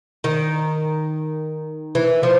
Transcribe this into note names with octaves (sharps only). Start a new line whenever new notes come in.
D#3
E3
F3